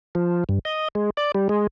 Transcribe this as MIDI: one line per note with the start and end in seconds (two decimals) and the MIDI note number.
0.15 0.44 53
0.49 0.59 43
0.65 0.88 75
0.95 1.10 56
1.17 1.32 74
1.35 1.48 55
1.49 1.67 56